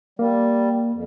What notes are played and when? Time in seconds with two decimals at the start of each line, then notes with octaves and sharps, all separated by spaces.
0.19 G3 A#3
0.92 F2